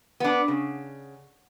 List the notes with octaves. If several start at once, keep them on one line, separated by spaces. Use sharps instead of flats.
B3 D4
C#3